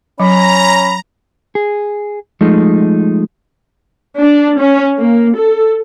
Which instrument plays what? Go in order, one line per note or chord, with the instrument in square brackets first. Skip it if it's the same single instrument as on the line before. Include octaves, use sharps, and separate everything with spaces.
[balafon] F#3 [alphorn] C#4 [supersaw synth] A#5 [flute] B5
[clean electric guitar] G#4
F3 G#3 A3 D#4
[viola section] D4
C#4
A#3
A4